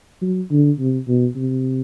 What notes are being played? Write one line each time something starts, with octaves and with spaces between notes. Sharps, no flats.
F#3
D3
C3
B2
C3